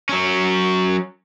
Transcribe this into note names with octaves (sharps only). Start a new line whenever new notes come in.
F#3 C#4